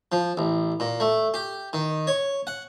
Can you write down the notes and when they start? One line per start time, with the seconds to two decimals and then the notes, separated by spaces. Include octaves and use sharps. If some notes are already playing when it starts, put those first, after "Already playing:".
0.12 F3
0.37 A1
0.80 A#2
1.00 A3
1.34 G4
1.73 D#3
2.07 C#5
2.47 F#5